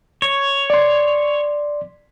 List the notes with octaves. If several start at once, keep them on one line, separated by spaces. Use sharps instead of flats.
C#5
D5 C6